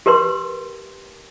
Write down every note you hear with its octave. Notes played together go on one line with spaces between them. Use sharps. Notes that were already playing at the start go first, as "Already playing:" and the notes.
G4 A#4 B4 C6